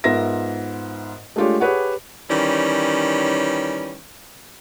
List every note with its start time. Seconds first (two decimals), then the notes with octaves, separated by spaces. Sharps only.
0.04 G#2 B3 F4 A#4 E5 A#6
1.36 G#3 A3 D4 F4 G4 C#5
1.60 G4 G#4 B4 C#5 F#5
2.30 D#3 E3 G3 C#4